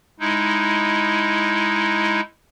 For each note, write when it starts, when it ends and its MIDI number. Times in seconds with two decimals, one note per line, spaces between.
0.20 2.20 56
0.20 2.20 63
0.20 2.20 64